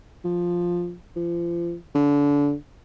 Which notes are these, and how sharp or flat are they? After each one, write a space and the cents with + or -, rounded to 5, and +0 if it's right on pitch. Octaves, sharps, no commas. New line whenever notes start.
F3 +5
F3 -35
D3 -30